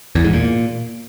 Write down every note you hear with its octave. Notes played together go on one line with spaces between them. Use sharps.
E2
G#2
A#2